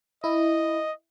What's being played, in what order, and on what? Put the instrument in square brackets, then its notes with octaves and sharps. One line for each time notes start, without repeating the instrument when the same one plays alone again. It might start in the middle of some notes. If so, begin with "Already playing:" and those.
[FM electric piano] E4 [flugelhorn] D#5